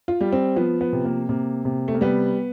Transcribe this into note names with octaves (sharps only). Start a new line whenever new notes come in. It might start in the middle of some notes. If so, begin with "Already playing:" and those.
F4
G3
C4
F3 B3
B3
C3
A#3
C3 A#3
C3
A3
A#3
G3 B3